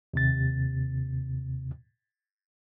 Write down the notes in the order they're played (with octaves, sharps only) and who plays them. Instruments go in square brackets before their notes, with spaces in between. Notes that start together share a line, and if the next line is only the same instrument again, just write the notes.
[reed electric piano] D#2 C3 A6